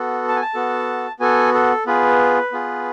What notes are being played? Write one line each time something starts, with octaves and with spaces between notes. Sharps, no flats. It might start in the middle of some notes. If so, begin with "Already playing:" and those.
Already playing: B3 F#4 A4
A5
G#5
A5
B3 F#4 A4
B3 F#4 A4 G#5
A4
B3 F4 G#4 B4
B3 F4 G#4